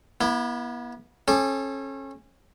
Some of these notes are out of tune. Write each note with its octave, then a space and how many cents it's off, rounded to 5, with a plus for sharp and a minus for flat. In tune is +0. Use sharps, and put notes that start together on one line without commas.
B3 -40 E4 +0
C#4 -30 A4 -30 D6 +15